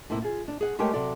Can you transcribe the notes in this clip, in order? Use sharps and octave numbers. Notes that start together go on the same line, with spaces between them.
A2 C3 A#3 E4
F4 G#4
D4
G#4 F#5
G#3 A3 G4 A#4 C#5 G5
C3 F#3 A4 D5